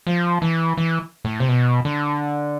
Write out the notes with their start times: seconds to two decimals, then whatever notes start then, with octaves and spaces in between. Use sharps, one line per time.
0.07 F3
0.42 E3
0.77 E3
1.25 A2
1.40 C3
1.48 B2
1.85 D3